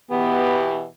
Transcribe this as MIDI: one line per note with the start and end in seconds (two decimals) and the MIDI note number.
0.11 0.85 47
0.11 0.85 52
0.11 0.68 59
0.11 0.85 67